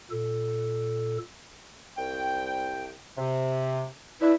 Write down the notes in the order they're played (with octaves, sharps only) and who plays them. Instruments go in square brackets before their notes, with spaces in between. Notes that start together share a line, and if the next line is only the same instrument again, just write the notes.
[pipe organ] A#2 A4
[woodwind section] C2 G5
C3
[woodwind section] D4 B4 E5 [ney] E4